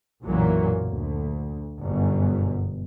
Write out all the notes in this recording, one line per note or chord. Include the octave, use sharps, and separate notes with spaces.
B1 F#2 A#2 E3 F#3 A#3
D2
G1 F#2 B2